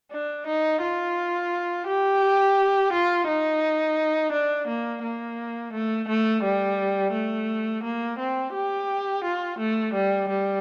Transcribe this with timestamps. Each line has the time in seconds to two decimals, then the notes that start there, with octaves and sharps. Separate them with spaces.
0.12 D4
0.47 D#4
0.82 F4
1.87 G4
2.93 F4
3.28 D#4
4.32 D4
4.68 A#3
5.03 A#3
5.73 A3
6.08 A3
6.43 G3
7.13 A3
7.83 A#3
8.18 C4
8.54 G4
9.24 F4
9.59 A3
9.94 G3
10.29 G3